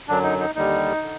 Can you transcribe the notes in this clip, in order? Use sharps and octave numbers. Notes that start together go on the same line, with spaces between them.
F#2 D3 F#3 D4
D#4
D#4
D#2 D3 G3 D#4
D3